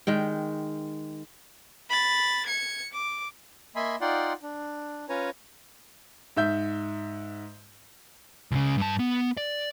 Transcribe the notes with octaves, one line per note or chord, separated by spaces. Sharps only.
D#3 G#3 G5
B5 A6
G#6 C#7
D6
A#3 D#5 E5 G#5 B5 C6
D#4 F4 D5 F#5 G5 C6
D4
C#4 F4 B4 C#5 G#5 A#5
G#2 E5 G6
C#2 C#3
G2 A5
B3
D5